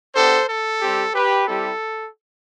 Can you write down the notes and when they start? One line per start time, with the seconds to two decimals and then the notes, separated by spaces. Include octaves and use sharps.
0.15 B3 D4 G4 A4 C5
0.49 A4
0.81 G3 C4 G4
1.14 G4 B4
1.47 G3 C4 E4 G4 A4